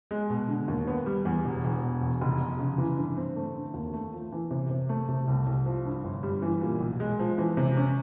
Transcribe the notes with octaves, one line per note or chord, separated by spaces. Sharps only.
G#3
B2
D3
D#2
B3
G3
E2
E1
E1
B2
E2
F1
F1
C#3
E3
G2
C4
A3
D3
D#2
A3
F3
E3
C3
C3
A3
C3
C2
C2
F3
G2
G1
G3
E3
A#2
B1
G#3
F3
E3
C3
C#4